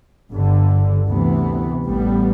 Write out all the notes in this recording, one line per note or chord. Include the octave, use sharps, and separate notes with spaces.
G1 G2 D3
D2 C3 E3 B3
A1 A2 G3 B3